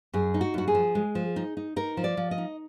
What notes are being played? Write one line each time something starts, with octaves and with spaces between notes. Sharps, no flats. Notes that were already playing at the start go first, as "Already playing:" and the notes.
F#2 G#4
D#4
F#4
F#2 F#4
G#4
F3
G#3
F3
D#4
D#4
D#4 A#4
F3
D5
F3
D#5
D#4